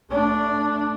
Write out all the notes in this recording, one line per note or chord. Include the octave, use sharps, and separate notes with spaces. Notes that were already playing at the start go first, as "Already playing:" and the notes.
A3 D4